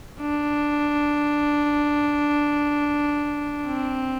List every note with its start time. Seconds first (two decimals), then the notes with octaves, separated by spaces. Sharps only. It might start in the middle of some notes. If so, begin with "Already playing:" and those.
0.21 D4
3.67 C4